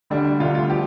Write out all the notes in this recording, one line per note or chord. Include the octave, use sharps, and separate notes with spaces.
D2 D3 G3 D4
D2 D3 G3 F4
F4
F3 G4